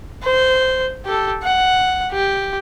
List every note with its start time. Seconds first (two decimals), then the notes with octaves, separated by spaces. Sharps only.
0.24 C5
1.05 G4 A4
1.43 F#5
2.11 G4